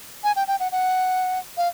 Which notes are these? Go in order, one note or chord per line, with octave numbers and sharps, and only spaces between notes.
G#5
G5
G5
F#5
F#5
F5